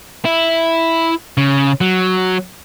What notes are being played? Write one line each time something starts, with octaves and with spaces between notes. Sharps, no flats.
E4
C#3
F#3